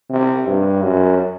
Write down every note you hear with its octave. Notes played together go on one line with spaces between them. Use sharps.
C3
G2
F#2